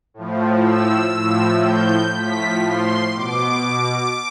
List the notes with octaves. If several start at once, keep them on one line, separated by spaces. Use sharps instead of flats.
A2 F3
E6
A2 F3
G6
A2 F3 B6
C6
B2 D6